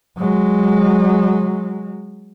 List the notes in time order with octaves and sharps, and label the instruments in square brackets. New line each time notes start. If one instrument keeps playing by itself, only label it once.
[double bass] F#3 G#3